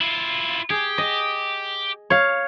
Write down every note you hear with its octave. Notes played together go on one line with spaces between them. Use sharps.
E4 F4
G4 G#4
D#5
C#5 F5